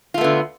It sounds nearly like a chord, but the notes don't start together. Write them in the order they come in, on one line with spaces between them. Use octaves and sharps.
F4 A3 B3 D3